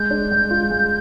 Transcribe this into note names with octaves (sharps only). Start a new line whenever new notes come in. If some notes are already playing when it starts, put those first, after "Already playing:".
Already playing: G#3 G6
D4
G#3
F4
G#3